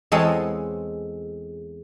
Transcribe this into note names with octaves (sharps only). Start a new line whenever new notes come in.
E2 G#3 C4 A4 C#5 G#5